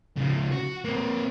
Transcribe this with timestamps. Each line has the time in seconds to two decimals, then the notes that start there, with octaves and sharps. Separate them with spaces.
0.17 C#3 F3
0.51 F#4
0.84 A#3 C4